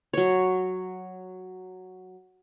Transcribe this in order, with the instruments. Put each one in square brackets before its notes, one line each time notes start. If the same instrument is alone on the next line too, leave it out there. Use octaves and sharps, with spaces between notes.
[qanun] F#3 C#5